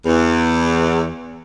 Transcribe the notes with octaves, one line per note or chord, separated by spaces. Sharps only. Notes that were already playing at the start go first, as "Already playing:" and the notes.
E2